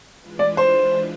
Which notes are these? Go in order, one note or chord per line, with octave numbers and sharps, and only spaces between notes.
E3 G#3 D4 F4 B4
D5
C5